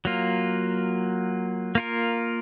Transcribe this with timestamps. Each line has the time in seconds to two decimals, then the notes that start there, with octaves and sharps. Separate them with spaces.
0.05 F#3 A#3 F4
1.75 A#3 F4 A#4